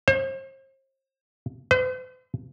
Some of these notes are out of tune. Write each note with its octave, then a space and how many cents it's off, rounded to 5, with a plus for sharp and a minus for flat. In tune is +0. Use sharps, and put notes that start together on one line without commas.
C5 +40
C5 -45